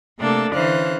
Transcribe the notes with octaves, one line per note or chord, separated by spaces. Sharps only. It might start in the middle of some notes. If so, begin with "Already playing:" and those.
C3 A3 A#3 D4 A4 A5
D3 E3 C#4 C5 F5 F#6